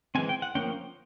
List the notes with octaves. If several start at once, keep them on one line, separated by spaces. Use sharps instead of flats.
E3 G#3 C4 G#5
G5
F#5
F3 A#3 C#4 G5